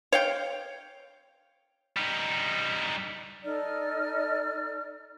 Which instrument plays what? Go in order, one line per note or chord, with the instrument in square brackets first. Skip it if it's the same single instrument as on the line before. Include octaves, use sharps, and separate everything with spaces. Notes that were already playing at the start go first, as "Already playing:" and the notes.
[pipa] C#5 F5 G5
[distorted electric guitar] G3 D#4
[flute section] D#4 A4 D5 F6